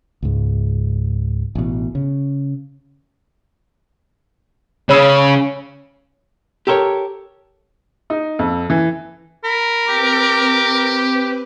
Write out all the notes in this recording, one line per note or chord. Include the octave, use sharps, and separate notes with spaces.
C#2 G#2
A1 B2
C#3
C#3 C#5 B5 E6
G4 A4 A#4 C5 C#5
D#4
F2
E3
A#4 B5
C4 G4 B4 D6